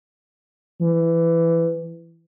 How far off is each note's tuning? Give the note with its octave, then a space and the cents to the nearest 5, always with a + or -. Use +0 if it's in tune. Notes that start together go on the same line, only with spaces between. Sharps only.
E3 +15